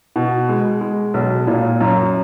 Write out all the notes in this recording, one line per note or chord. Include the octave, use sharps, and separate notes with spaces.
B2
G#3
G#3
B1
A#2
F#2